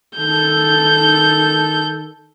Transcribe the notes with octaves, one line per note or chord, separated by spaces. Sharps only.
D#3 A4 G6